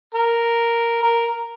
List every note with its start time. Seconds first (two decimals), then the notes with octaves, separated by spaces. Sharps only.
0.15 A#4
1.03 A#4